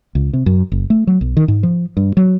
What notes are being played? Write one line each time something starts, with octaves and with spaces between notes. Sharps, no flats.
C#2
C3
F#2
F#1
A3
F#3
B1
D#3
G#2
F3
G2
F#3